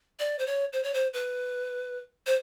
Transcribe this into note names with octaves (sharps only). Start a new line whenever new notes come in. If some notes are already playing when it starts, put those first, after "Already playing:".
D5
C5
C#5
C5
C#5
C5
B4
C5